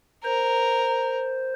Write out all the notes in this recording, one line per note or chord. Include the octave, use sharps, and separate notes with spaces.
A#4 C5